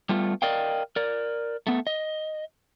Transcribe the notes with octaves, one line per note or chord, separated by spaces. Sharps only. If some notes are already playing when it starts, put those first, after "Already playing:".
G3 A3 B3 F4
A#4 D5 D#5 F5 G5
A#4 D5
A3 B3
D#5